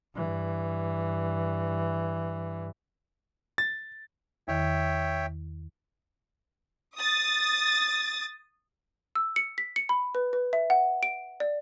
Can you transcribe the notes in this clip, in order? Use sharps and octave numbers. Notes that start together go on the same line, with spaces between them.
G2 E3
A6
E2 D#3 C#5 E5 G5
D#6 A6
E6
C#7
B6
C#7
B5
B4
B4
E5
F#5
D7
D5